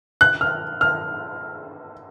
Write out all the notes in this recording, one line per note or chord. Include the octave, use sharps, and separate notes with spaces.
F#6
F6
F6